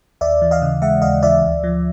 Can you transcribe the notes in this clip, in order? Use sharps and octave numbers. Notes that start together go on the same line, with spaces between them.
D#2 D5 E5
E3
D#5 F5
C#3
G#3 E5 F#5
D#2 D#5 F5
E3 D5 E5
D2
F3